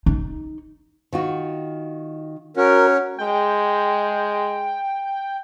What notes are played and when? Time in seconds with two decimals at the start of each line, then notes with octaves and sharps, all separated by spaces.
0.06 D#4
1.13 D#3 F4 F#4
2.57 C#4 F#4 A#4
3.19 G#3 G5